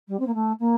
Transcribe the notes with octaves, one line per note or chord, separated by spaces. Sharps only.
G3
C4
A#3
A3
A#3